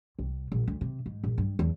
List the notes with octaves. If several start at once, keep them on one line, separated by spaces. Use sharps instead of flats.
C2
A#1
D2
C3
G#2
A#1
G2
E2